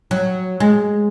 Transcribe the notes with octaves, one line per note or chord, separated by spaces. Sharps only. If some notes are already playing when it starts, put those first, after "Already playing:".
F#3
G#3